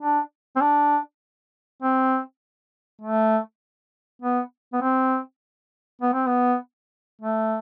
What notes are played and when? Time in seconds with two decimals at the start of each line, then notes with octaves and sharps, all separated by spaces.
0.02 D4
0.56 C4
0.61 D4
1.82 C4
3.02 A3
4.22 B3
4.73 B3
4.81 C4
6.02 B3
6.14 C4
6.26 B3
7.22 A3